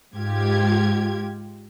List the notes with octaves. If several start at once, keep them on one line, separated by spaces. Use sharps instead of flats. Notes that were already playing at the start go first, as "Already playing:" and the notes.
G#2 F4 G4 G#6